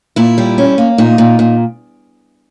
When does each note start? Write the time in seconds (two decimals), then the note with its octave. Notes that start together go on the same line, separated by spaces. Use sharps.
0.16 A#2 E4
0.38 G3
0.58 C#4
0.78 A#3
0.98 A#2 D#4
1.18 A#2
1.39 A#2